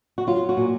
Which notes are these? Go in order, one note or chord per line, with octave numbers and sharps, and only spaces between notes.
F#4
F#3 F4
F#4
A#2